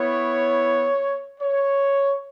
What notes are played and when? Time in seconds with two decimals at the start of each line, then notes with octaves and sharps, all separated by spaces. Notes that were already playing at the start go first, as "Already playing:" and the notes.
Already playing: B3 E4 C#5
1.41 C#5